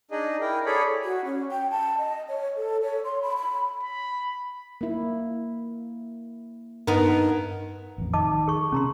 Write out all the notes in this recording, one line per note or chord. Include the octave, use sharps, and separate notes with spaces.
D4 D#4 G#4 D#5
E4 A#4 G5
G#4 A4 C#5 D5 B5
F#4
C#4
G5
A5
D#5
C#5
A4
C#5
C6
B5
B5
B5
A#3 E4
G2 B3 D#4 A#4
A1 F2
D#3 D#5 A5 D6
G#4 C#6
C3 C4 C#4 A#5 C6